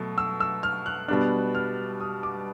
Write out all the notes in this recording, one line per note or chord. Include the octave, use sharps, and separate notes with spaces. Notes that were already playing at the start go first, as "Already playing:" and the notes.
Already playing: B2 F#3 A3
E6
E6
F6
F#6
B2 G3 B3 D4 F#6
F6
D#6
D6